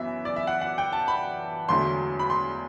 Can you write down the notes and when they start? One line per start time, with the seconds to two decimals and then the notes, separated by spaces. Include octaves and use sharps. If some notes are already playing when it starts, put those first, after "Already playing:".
Already playing: F#2 E3 B3 E5
0.25 D5
0.36 E5
0.47 F#5
0.61 F#5
0.78 G5
0.93 A5
1.08 B5
1.68 E1 E2 D3 F#3 A3 C6
2.19 B5
2.30 C6